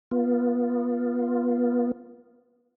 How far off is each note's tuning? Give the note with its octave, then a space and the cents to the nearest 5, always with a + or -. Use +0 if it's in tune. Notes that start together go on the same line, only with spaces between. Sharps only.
B3 -25 F4 +0